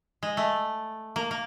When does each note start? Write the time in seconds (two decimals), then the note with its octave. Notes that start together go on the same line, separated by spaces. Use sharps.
0.23 G#3
0.37 A3
1.16 A#3
1.31 A#3